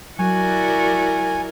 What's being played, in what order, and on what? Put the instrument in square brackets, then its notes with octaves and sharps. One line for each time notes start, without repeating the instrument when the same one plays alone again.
[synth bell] F#3 [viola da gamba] E4 A#4 [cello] F#4 D5 [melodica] G#5